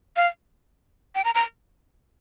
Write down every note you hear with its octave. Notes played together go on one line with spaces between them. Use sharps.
F5
G5
A#5
A#5